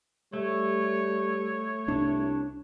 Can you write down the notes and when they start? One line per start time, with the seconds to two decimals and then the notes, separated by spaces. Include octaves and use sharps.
0.33 G3 A3 C#5
1.88 C2 D4